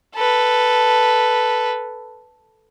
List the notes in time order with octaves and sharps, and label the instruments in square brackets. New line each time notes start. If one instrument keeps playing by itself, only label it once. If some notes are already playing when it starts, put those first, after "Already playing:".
[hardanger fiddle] A4 B4